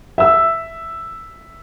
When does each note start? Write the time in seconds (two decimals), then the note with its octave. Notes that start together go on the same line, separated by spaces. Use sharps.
0.18 E5 E6